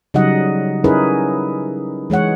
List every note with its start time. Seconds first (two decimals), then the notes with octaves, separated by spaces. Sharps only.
0.14 C#3 F#3 G3 D#4 D#5 F#5
0.84 C#4 D#4 E4 G#4 A#4 B4
2.10 E3 G#3 C#5 F#5